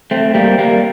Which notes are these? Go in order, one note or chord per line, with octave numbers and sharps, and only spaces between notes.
A3 C4
G3 A#3
G3 A#3